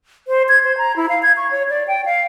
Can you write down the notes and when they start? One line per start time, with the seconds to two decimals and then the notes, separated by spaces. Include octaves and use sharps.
0.28 C5
0.49 G#6
0.64 C5
0.78 A#5
0.96 E4
1.09 F5
1.22 G#6
1.37 C#6
1.51 C#5
1.70 D5
1.88 G5
2.06 F5